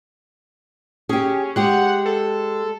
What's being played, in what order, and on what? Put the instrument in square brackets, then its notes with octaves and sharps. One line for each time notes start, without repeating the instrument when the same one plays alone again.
[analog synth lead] C#4 [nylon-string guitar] G4 G#4
[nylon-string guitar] G#3 G4 [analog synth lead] F#5
[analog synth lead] A4